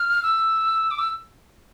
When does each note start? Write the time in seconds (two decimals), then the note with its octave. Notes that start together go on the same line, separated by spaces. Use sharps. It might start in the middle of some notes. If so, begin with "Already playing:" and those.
Already playing: F6
0.23 E6
0.91 D6
0.99 E6